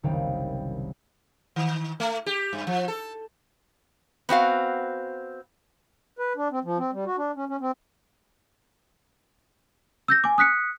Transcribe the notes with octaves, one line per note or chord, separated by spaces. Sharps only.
F#1 C2 D#3 D#4 F5 G5
D#3
A3
G4
G2
F3
A4
B3 C4 F#4 F5
B4
D4
C4
F3
C4
G3
F#4
D4
C#4
C#4
C4
E6 G6 A#6
G#5 D6
D#6 F#6 B6 C#7